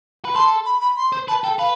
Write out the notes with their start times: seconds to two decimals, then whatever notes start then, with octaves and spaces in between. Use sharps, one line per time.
0.25 B4
0.35 A4 C6
0.66 B5
0.81 B5
0.97 C6
1.13 C5
1.28 B4 A5
1.44 A4 G5
1.59 B4 F5